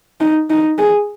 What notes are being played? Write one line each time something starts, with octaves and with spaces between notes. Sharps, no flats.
D#4
D#4
G#4